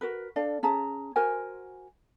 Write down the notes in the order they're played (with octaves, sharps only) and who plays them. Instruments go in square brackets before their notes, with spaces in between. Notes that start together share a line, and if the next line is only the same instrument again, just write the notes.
[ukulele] F#4 A#4 B4
D4 A4 D5 F5
C#4 G#4 A5 A#5
F#4 A#4 C5 G#5